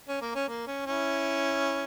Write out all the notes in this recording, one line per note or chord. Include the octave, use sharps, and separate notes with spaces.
C#4
A#3
C#4
A#3
C#4
C#4 E4